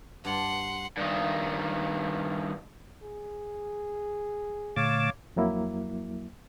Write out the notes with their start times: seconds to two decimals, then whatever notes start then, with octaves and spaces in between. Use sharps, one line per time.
0.25 G2 D5 F5 F#5 C6
0.98 G2 D#3
3.03 G#4
4.77 A#2 D3 A3 C#5 F5 D6
5.36 F2 F#3 A#3 E4